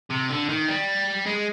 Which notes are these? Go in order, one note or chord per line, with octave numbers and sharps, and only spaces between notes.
C3
D3
D#3
G3
G#3